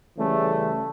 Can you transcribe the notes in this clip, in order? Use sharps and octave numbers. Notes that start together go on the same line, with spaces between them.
C#3 E3 G3 A3